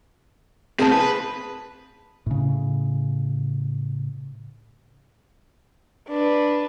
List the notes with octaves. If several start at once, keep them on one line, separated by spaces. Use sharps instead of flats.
A2 C4 G#4 A5
B4
A2 C#3
D4 B4